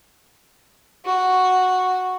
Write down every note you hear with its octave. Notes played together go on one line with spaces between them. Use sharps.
F#4